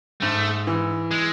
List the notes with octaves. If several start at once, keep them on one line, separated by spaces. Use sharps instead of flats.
G#2 A3
E3
G#3